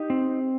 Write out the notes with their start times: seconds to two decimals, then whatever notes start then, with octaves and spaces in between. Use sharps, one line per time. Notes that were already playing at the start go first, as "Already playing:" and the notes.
Already playing: D#4 G4
0.10 C4